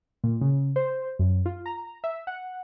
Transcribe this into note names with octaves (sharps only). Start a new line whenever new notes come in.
A#2
C#3
C5
F#2
F4
A#5
E5
F#5